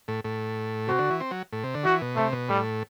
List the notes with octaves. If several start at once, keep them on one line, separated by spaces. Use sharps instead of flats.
A2
A2
C3 F#4
D3
E3
C4
F#3
A2
C3
D3
E3 F#4
B2
C3 A3
B2
A2 G3